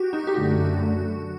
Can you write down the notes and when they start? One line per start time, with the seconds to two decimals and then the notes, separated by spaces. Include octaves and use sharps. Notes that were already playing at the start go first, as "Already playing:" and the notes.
Already playing: F#4 G4
0.13 D#4
0.27 G4
0.34 F#2 D3 A3 F#4